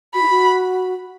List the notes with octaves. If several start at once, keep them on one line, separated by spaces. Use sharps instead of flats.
F#4 B5
E4
F#4